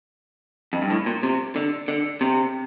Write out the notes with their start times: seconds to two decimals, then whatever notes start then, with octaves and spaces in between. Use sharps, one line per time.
0.73 F2
0.82 G2
0.90 A2
1.06 A#2
1.23 C3
1.56 D3
1.88 D3
2.21 C3